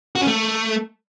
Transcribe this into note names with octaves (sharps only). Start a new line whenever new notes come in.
F#4
C#4
A3